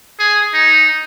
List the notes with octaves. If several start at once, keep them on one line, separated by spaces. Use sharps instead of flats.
G#4
D#4